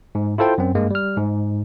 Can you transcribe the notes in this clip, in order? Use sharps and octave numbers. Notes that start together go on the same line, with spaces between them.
G#2
E4 F4 A4 C5 G5
F#2 C4
G2 G#3 A#3
G3 F6
G#2